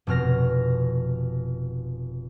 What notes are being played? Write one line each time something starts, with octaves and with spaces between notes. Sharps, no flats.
F1 B2 F6 A#6